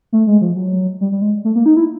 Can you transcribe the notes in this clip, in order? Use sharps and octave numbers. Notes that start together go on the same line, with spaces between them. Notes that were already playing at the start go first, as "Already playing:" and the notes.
A3
G#3
F3
F#3
G3
G3
G#3
A3
A#3
D#4
E4